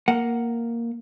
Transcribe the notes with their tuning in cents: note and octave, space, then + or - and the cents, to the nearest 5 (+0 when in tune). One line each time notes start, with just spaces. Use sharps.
A#3 +0 F#5 +0